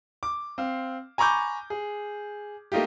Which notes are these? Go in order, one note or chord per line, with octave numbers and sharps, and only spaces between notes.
D6
C4 F5
G#5 A#5 B5 C#6 D6 G6
G#4
A3 A#3 D#4 F4 G4